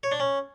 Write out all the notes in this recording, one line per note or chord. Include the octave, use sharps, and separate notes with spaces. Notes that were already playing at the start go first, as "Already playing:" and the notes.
C#5
D4
C#4